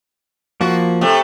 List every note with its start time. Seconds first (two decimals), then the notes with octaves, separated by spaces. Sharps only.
0.61 F3 A#3 F#4
1.01 C3 A3